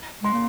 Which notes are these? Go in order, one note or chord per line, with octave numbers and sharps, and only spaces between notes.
G#3 C6
A#3